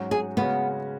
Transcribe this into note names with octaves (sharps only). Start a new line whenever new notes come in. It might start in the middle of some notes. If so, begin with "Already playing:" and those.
Already playing: G#2 F#3 C#4 F#4
G#4
C#3 G#3 B3 C#4 F#4